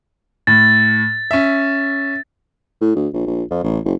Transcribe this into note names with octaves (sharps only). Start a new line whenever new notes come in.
A2 A6
C#4 E5
A2
D2
A#1
A#1
F2
A1
F#1